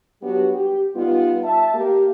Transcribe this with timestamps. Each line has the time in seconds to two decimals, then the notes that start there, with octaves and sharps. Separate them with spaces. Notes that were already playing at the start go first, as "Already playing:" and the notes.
0.22 F#3 G3 B3 D4 F#4 G4
0.54 G4
0.95 G3 B3 D#4 F4
1.44 E5 A5
1.74 A#3 G4